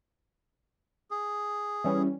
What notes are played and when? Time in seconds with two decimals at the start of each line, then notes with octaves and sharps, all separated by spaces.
1.11 G#4
1.84 E3 G3 C#4